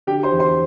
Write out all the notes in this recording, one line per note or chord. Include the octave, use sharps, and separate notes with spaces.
D3 G4 G5
C5 C6
E2
C5 C6